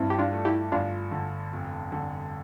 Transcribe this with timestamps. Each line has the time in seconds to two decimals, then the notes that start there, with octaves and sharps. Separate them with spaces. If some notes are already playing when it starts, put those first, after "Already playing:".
Already playing: G2 C4 E4
0.10 G4
0.19 D4 F4
0.32 A3
0.45 E4 G4
0.72 G1 D4 F4
1.11 D3
1.53 F1
1.92 D3